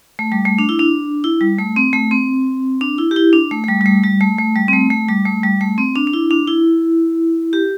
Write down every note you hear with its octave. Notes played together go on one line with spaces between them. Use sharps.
A3
G3
A3
D4
E4
D4
E4
G3
A3
C4
A3
C4
D4
E4
G4
E4
D4
A3
A3
G3
G3
A3
G3
A3
A3
G3
C4
A3
A3
G3
A3
G3
A3
C4
D4
D4
E4
D4
E4
G4